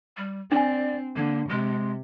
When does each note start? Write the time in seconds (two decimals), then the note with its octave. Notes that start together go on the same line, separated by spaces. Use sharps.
0.17 G3
0.52 C4 D4 D5 G#5
1.16 D3 A#3
1.49 C3 G#3